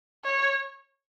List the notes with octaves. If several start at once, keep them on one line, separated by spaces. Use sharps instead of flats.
C#5